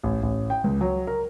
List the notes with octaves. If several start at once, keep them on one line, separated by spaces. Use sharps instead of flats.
A1
A1
G5
C#2
F#3
A#4